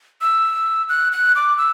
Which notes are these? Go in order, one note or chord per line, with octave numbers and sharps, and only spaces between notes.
E6
F#6
F#6
D6
E6